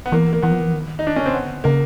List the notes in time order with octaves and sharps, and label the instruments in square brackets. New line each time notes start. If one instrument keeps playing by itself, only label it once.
[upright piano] B3
[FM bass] E3 [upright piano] A#3
[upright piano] A#3
[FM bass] E3 [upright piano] B3
[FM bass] F3
E3
D#3
[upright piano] D#4
D4
C#4
[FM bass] C#3 [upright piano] C4
[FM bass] D3 [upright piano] B3
[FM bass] C#3 [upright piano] A#3